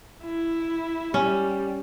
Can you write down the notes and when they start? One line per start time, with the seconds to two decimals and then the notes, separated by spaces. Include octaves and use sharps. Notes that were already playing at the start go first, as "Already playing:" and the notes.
0.25 E4
1.14 G3 C#4